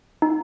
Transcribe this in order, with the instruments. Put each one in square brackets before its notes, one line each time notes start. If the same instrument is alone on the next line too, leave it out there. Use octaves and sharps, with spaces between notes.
[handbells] D#4